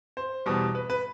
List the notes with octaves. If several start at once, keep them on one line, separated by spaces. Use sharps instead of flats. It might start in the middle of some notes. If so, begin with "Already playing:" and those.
C5
E2 B2 G3
B4
B4